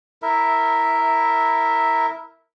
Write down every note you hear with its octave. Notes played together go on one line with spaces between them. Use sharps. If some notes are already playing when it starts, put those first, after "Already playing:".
E4 A#4 E5